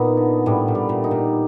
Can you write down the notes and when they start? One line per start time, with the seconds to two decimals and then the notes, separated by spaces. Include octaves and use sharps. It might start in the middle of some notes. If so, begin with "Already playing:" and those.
Already playing: A#2 B3 D#4
0.17 D3
0.46 A2 G3
0.68 A#2
0.75 G3
0.89 A#2
1.04 D#4
1.11 A#2